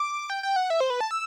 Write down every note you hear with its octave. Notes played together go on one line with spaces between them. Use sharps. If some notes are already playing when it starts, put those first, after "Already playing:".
Already playing: D6
G5
G5
F#5
E5
C5
B4
A5
E6